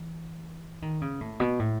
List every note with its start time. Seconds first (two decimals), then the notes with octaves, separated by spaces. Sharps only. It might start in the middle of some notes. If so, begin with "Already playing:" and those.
Already playing: E3
0.82 D#3
1.01 C#3
1.21 A2
1.40 B2
1.59 A2